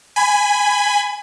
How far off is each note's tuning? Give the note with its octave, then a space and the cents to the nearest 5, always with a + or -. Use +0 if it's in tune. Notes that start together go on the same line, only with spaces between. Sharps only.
G#5 +0 B5 +20